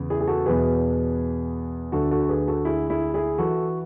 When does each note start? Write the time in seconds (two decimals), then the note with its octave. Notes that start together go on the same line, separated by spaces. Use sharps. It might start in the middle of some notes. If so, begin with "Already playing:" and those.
Already playing: E2 C#3
0.10 E4 G#4
0.20 G#4
0.28 F#4 A4
0.46 E2 B2 G#4 B4
1.92 D2 D3 F#4 A4
2.11 F#4 A4
2.29 G#4 B4
2.48 F#4 A4
2.65 E4 G#4
2.90 E4 G#4
3.14 E4 G#4
3.38 E3 F#4 A4